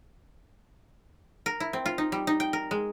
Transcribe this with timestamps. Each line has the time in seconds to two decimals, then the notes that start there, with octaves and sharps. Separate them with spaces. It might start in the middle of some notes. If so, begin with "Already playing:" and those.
1.46 A#4
1.60 E4
1.73 C4
1.86 F4
1.98 D#4
2.12 G3
2.27 D#4
2.40 G5
2.53 A#4
2.71 G#3